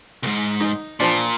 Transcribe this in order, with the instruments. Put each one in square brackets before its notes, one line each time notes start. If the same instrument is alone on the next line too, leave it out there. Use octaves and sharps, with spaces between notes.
[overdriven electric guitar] C2 G#2
[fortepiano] D#4
[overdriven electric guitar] A#2 [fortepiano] F3 D4